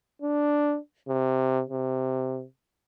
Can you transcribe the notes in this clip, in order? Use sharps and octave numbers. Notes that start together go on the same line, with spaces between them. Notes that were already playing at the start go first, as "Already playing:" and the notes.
D4
C3
C3